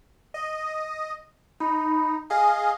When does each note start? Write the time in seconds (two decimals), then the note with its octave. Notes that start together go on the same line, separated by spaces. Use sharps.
0.34 D#5
1.60 D#4 B5
2.30 G#4 D#5 F5 G#5